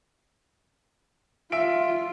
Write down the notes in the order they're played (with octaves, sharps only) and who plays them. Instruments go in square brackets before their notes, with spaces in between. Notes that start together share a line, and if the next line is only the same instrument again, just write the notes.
[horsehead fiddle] F4 [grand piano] E5 D7